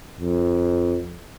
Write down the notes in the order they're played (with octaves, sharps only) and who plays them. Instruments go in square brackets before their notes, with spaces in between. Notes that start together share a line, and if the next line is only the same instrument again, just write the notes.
[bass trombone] F2